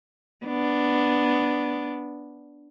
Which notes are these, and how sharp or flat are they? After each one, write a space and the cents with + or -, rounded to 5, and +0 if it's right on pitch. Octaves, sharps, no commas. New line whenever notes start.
B3 +0 D4 +0